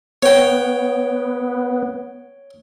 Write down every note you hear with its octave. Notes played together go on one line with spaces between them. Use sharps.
B3 C#5 G5